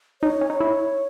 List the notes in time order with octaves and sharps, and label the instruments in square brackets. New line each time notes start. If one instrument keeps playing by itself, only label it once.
[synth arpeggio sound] D#4 [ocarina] C#5
[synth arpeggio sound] C#4
D#4
E4